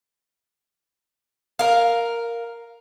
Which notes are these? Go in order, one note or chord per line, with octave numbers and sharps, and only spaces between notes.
A#4 F5